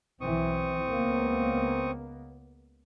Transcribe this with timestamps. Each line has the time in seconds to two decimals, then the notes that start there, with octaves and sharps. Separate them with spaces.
0.21 B1 E3 C4 C#6 D#6
0.89 C#2 A#3 B3